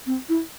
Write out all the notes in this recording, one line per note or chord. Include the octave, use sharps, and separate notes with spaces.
C4
E4